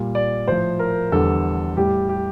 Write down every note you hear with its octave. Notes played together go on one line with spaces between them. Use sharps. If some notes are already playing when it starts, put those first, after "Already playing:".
Already playing: A#2 G3
D5
A2 F3 C5
A#4
E2 D3 G3 A4
A2 G3 G4
G4